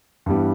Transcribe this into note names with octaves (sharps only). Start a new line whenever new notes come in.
G2 E3 G3 B3